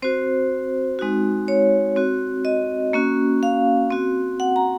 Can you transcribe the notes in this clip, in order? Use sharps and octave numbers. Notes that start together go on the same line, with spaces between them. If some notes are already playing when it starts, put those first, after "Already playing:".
C4 F#4 C5
G#3 C4 D#4 F#4
C#5
C4 F#4
D#5
A#3 C#4 F#4
F5
C4 F#4
F#5
A#5